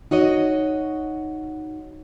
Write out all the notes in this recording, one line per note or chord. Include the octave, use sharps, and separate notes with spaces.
D#4 F#4 C#5 D#5